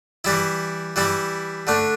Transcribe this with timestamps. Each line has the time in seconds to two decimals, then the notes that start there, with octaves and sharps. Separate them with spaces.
0.24 E3 G3 E4
0.96 E3 G3 E4
1.67 D3 A3 D4